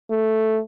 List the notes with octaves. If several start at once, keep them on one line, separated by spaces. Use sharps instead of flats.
A3